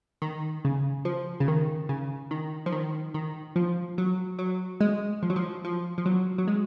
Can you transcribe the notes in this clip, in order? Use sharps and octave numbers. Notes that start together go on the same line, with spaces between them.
D#3
C#3
F3
C#3
D#3
C#3
D#3
F3
D#3
D#3
F3
F#3
F#3
G#3
F3
F#3
F3
F3
F3
F#3
F#3
G#3